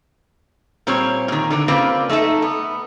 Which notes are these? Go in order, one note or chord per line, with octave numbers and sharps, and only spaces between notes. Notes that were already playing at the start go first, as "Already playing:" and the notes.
A#2 G3 C4 C#5
A#2 D#3
D3 E3 D4
C#3 A#3 C4 F4 B4 D5
A3 D#4 A4 E5
B3